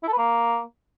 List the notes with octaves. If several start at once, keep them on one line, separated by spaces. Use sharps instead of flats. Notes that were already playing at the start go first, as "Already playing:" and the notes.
E4
A4
B4
A#3